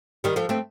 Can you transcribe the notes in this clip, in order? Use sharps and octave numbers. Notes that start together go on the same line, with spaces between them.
D#3 G3
F3 A3
A3 C4